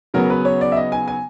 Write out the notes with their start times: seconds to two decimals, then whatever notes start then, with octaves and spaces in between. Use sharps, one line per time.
0.14 C#3 F#3 B3 A#4
0.30 B4
0.45 C#5
0.61 D5
0.72 E5
0.76 D#5
0.92 G#5
1.08 G#5